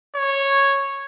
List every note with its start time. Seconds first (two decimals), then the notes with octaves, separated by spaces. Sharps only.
0.16 C#5